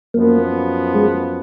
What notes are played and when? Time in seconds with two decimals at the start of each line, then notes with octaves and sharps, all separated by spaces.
0.14 F#2 F3 A#3 B3
0.95 G#3